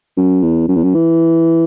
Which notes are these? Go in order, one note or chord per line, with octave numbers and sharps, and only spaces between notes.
F#2
E2
F#2
E2
F#2
E3